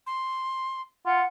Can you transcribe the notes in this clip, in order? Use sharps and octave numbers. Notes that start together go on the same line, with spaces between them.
C6
F4 F#5